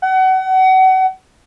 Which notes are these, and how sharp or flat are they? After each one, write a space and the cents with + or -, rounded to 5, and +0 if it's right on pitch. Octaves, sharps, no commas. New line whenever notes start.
F#5 +30